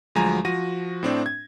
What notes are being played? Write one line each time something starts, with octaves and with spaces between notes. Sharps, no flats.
D2 F3 F#3 G#3 G#5 A#5
F3 F#4 A#6 D#7
A2 C4 D4
G#6